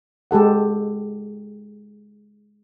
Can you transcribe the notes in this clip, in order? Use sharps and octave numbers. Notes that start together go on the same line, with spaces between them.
G#3 G4 A4 F#5